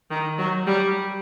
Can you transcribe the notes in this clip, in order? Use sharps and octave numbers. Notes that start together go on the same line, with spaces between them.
D#3
F#3
G3